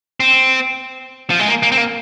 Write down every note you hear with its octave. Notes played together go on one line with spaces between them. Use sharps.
C4
F3
G#3
A#3
A#3
C4
A#3